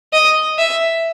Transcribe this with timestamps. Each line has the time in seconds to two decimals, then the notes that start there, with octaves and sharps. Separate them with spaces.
0.13 D#5
0.58 E5